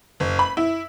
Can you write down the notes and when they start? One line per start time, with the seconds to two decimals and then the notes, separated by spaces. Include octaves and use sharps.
0.20 F#1
0.39 B5
0.57 E4